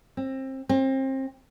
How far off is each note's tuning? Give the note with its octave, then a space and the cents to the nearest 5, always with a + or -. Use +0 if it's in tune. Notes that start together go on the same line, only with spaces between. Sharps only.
C4 +25
C4 +30